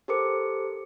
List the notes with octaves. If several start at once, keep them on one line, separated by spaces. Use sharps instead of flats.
G4 A4 A#4 C5 D6 C#7